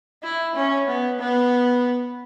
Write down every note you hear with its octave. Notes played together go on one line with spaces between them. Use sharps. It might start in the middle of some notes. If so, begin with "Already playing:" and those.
E4
C#4
B3
B3